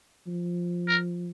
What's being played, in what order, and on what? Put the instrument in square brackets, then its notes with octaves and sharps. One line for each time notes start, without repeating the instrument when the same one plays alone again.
[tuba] F3
[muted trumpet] A#4